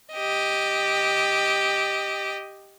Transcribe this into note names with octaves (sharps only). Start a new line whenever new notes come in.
G4 D#5